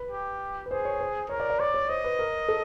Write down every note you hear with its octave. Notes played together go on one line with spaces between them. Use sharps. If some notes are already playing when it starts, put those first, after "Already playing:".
Already playing: B4
G4
B4
G#4 C5
C#5
C5
A#4 C#5
D5
D5
C#5 D5
C#5
C5 D#5
B4
A#4
A4